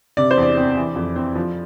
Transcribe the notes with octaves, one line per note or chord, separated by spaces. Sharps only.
C3 D5
C5
E2
D5
C4
E3
F2
C4
F3